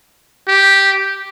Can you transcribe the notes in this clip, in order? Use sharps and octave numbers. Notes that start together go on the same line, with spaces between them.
G4